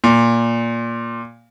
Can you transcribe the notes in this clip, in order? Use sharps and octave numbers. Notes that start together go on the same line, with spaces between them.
A#2